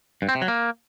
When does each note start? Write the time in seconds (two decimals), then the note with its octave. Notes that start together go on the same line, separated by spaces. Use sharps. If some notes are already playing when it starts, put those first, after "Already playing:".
0.22 G2
0.29 C4
0.35 C3
0.42 F#3
0.48 A#3